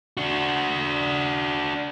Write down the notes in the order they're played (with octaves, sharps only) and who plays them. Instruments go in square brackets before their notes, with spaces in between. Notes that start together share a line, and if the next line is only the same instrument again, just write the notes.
[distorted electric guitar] D4 F#4